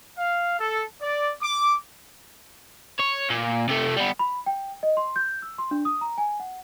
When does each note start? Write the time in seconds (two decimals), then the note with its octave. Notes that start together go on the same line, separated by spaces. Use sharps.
0.18 F5
0.59 A4
1.02 D5
1.43 D6
2.99 C#5
3.30 A#2
3.69 C3 A3
3.97 G3 B3
4.19 B5
4.46 G5
4.83 D#5
4.97 C6
5.16 G6
5.42 E6
5.58 C6
5.71 D4
5.85 D#6
6.01 A#5
6.18 G#5
6.40 F#5